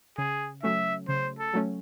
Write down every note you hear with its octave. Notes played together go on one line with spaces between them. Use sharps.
C#3 G#4
F#3 A3 C#4 E5
C#3 C5
A4
F#3 A3 C#4